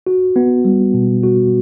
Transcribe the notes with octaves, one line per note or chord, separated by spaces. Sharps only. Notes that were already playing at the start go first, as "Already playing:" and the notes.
F#4
B3
G3
B2
F#4